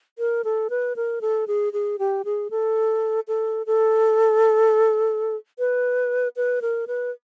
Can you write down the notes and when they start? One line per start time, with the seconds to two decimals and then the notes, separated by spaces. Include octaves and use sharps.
0.19 A#4
0.44 A4
0.70 B4
0.96 A#4
1.21 A4
1.48 G#4
1.73 G#4
1.99 G4
2.25 G#4
2.51 A4
3.28 A4
3.66 A4
5.59 B4
6.36 B4
6.62 A#4
6.87 B4